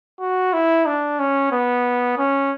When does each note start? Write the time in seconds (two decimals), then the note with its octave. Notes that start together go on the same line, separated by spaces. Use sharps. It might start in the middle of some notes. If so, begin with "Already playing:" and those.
0.20 F#4
0.53 E4
0.86 D4
1.20 C#4
1.52 B3
2.18 C#4